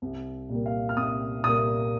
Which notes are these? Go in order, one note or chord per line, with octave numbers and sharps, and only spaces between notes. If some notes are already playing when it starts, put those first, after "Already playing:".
C2
A#2 G3 A#3
F5
F6
C2 D#6
A#2 G3 A#3 D#6